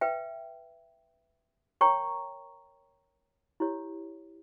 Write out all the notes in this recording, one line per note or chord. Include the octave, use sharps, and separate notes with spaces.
B4 E5 G5
A#4 C#5 G5 A#5 C#6
E4 G4 C#5